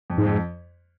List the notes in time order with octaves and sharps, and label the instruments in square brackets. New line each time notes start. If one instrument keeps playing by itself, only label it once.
[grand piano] F2
[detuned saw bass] G#2
[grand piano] F2